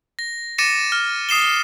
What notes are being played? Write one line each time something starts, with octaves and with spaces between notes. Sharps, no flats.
A#6
D6 A6 A#6 C#7 D#7 E7
F6
D#6 C7 E7 G7
G7